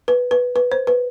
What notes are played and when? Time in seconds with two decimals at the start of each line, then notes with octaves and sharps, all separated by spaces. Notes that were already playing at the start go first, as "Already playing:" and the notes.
0.08 B4
0.31 B4
0.56 B4
0.72 C5
0.87 B4